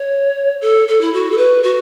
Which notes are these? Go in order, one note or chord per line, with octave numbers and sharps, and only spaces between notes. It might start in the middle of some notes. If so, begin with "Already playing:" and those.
Already playing: C#5
A4
A4
E4
F#4
A4
B4
F#4